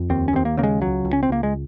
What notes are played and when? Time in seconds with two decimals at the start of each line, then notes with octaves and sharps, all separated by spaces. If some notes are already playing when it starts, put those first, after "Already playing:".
Already playing: F2
0.10 D#2 C4
0.28 C#4
0.33 D#2 C4
0.45 A#3
0.57 C#3 A#3
0.63 G#3
0.81 C#2 F#3
1.05 C#2
1.13 C#4
1.23 C4
1.29 C#2 A#3
1.43 G#3